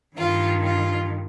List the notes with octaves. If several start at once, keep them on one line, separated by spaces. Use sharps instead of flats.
G2 D#3 F4
F4